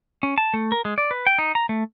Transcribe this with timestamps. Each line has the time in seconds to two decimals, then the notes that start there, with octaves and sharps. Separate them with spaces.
0.23 C#4
0.38 A5
0.54 A3
0.72 A#4
0.85 G#3
0.98 D5
1.11 B4
1.27 G5
1.38 D#4
1.55 A#5
1.69 A3